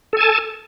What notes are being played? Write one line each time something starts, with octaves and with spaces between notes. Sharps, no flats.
A4 G#5 A5